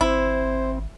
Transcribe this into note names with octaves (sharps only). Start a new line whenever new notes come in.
G#1 C4 E4 C5